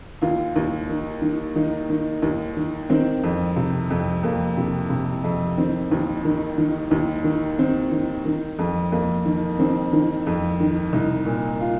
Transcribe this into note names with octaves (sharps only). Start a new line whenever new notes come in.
D#2 F4
D#2
D#3
D#3
D#3 D#4
D#3
D#2
D#3
D#3 C4
F2
C3
F2
F2 A#3
C3
C3
F2
D#3 C4
D#2
D#3
D#3
D#2
D#3
D#3 C4
D#3
D#3
F2
F2 A#3
D#3
D#3 C4
D#3
F2
D#3
C2 D#4
A#2
F4